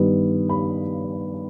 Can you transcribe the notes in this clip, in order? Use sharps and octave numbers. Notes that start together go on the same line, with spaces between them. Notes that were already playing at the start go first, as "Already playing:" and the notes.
Already playing: G2 D#3 G3 B3
B5